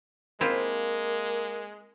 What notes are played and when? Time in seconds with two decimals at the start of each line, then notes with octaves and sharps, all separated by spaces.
0.41 G#3 A#3 C4 E4 F4